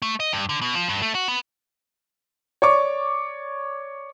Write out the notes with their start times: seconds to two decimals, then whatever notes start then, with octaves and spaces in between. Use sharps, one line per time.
0.02 A3
0.20 D#5
0.33 G2
0.49 D3
0.62 B2
0.75 F3
0.89 G2
1.02 A3
1.15 F#4
1.28 B3
2.62 C#5 D5 C#6 D6